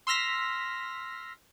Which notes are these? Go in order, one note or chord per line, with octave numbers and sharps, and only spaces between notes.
C6 E6 F6 A#6 B6